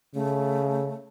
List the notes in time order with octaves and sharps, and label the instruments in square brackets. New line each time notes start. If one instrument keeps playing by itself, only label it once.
[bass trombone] C#3 [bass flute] A3